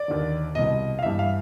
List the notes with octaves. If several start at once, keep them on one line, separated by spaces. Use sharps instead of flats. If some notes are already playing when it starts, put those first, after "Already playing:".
Already playing: D5
D#2 D3
C2 B2 D#5
F5
G2 E3 E5
F5